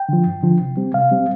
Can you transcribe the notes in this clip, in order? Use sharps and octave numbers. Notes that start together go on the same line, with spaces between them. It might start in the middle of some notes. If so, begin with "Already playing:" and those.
Already playing: G5
D3 F3
G2
D3 F3
C3
G3 C4
C3 F5
G3 C4